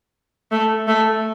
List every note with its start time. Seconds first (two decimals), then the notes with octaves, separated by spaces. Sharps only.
0.52 A3
0.88 A3